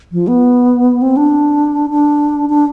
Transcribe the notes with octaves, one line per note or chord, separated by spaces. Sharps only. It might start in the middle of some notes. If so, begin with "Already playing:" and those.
F3
B3
C4
D4
D4
D4